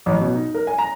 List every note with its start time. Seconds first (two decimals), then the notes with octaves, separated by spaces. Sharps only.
0.06 A1
0.21 B2
0.35 D#4
0.54 A#4
0.67 G#5
0.79 A#5